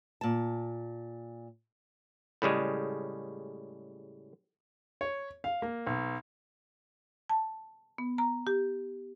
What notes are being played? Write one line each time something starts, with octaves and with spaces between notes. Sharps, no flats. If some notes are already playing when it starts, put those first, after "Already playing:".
A#2 A5
A2 C#3 G3 G#3
C#5
F5
A#3
B1
A5
B3
A#5
G4